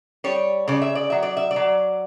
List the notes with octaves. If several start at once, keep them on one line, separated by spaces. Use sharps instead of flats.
G3 C#5
C#3 D5
E5
D5
F#3 E5
D5
E5
D5
F#3